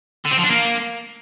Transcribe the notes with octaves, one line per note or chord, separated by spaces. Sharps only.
D3
C4
F3
D4
A#3